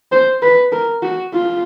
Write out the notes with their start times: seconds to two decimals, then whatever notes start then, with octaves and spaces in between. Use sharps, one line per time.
0.12 C5
0.42 B4
0.72 A#4
1.02 F#4
1.33 F4